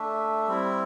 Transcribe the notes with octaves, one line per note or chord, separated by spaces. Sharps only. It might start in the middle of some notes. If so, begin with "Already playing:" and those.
Already playing: A3 D4 E5
G3 C4 E4